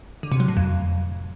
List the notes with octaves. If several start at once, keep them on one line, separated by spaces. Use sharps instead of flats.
D3
C3
F#3
A2
F2